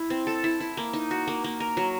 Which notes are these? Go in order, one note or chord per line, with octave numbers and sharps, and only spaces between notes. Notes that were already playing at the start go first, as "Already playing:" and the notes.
Already playing: E4
C4
A4
E4
E4
A#3
D#4
F#4
A#3
A#3
A#4
F#3